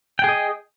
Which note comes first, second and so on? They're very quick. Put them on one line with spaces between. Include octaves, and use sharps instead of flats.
G5 G#4 D#5